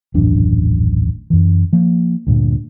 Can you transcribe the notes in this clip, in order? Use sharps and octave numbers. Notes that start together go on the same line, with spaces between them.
D#1 A1 F#2 D4
F#2 E3
F3 A#3
D2 G2 A#2